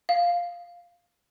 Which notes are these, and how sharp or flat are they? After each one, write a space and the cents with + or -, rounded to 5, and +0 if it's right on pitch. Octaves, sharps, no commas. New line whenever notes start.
F5 +0